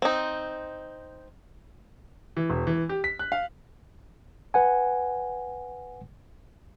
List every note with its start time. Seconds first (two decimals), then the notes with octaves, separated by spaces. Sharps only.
0.02 C4 D#4
2.37 E3
2.50 E1
2.67 E3
2.89 G4
3.04 B6
3.19 F#6
3.32 F5
4.54 B4 F#5 G#5